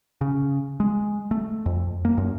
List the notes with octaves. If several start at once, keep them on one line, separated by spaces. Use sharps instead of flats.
C#3
G#3
A3
F2
A#3
F#2